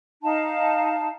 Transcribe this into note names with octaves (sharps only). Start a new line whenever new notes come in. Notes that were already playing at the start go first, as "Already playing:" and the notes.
D#4 F5 A5